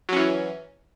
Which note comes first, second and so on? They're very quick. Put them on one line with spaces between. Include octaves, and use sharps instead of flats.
F#3 C#4 E3